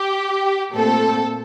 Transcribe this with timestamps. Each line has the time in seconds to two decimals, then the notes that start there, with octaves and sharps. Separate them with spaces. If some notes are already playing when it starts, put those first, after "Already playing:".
Already playing: G4
0.74 A#2 A3 C4 A4